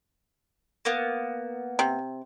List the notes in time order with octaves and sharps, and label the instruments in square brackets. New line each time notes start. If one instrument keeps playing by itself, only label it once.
[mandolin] A#3 B3
[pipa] C3